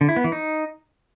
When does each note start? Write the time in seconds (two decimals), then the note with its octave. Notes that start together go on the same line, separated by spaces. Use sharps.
0.01 D3
0.09 E4
0.16 B3
0.24 E3
0.32 D#4